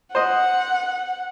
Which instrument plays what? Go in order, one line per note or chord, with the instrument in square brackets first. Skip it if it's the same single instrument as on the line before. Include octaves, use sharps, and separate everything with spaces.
[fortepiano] C5 D#5 [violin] F#5